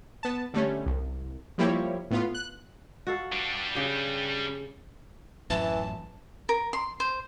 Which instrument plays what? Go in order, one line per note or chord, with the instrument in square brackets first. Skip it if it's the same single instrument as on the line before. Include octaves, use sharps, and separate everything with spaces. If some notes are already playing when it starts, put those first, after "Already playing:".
[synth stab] B3 A5
D3 G3 A3 C#4
C2
F3 G3 A#3 E4 G4 C#5
A2 B3 F4
F#6
[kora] F#4 A4 F5
[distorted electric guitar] G3 D4
[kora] C#3 G4
[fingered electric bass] A1 F#2 [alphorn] E3 [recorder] A5
[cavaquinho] A#4
C6
C5